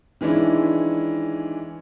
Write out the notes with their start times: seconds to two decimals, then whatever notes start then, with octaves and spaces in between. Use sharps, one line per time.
0.21 D#3 E3 G#3 C#4 D4 E4